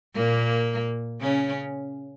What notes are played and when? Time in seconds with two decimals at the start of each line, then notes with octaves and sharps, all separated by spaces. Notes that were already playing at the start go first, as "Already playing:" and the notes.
0.15 A#2 A#3
1.21 C#3 C#4